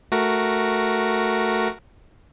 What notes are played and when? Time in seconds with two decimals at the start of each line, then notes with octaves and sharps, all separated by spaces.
0.12 A3 F#4 A#4